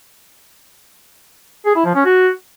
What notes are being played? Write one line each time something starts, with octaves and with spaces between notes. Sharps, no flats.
G#4
E4
F3
C#4
F#4